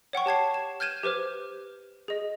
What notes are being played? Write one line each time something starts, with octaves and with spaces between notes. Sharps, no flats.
C#5 F#5 G5 C#6
G4 A5 G#6 C7
E7
F6 G6 G#6 D#7 E7
G4 B4 C5 F6
G#4 D#5